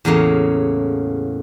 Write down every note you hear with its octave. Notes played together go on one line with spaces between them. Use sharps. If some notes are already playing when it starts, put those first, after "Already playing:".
E2 A2 C#3 A#3 C#5